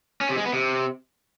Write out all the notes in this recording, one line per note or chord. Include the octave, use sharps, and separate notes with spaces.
C#4
C3
G#3
B3
C3